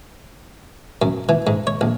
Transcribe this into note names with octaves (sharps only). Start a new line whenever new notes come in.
F#2
E3
G#2
C#5
A#1